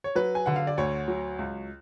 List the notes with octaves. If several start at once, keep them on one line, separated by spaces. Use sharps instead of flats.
C#5
F#3 B4
G#5
D3 F#5
F5
D5
D2 C#5
F#3
C#2